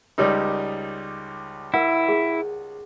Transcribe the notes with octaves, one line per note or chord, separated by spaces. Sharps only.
C#2 G3 D#4 A#4 C#5 D5
E4 A#4 F#5
G#4